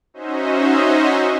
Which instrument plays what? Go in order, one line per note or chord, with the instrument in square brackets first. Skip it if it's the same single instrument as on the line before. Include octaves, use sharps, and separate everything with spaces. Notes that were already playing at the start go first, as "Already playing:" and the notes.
[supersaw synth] C#4 D#4 F#4 C5 D#5 E5